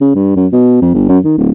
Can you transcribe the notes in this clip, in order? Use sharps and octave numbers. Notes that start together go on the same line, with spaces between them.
C#3
G2
F#2
B2
F2
G1
F#2
D#3
D1